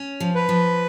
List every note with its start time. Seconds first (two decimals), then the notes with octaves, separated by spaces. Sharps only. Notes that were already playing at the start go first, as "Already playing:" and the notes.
Already playing: C#4
0.20 F3
0.35 B4
0.49 F3